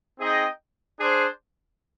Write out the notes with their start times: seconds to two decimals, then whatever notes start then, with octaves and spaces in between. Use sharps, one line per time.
0.19 C4 D#4 G#4 D#5 G5
0.99 D4 G#4 C5